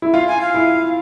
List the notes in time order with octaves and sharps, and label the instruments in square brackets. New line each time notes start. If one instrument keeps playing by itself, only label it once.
[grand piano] E4
[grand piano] F4 [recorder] F5
[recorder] G#5
F5
[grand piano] E4